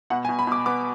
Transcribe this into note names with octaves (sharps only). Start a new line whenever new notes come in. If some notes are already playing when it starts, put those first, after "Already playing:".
B2 F#5
G#5
B2
B5
B2 D6
B3 D6